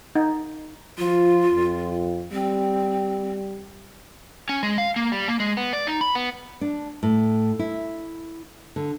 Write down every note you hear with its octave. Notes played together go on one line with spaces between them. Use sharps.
D#4
F3 F4
F2
G3 C4
C#4
G#3
F5
A#3
G3
A#3
G#3
B3
D5
D#4
B5
B3
D4
A2
E4
D3